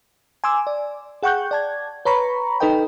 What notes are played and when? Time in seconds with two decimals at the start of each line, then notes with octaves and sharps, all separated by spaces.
0.44 G#5 C6 D6 E6
0.67 D5
1.23 G#4 F#5 G5 C#6 F#6 G6
1.51 D5 A5 G#6
2.05 B4 C#5 A#5 B5 C#6
2.60 D#4 A4 B4 D#5 G5